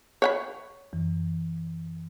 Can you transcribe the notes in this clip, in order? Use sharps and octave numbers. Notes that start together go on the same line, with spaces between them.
C#5 F#5 B5
F#2 E3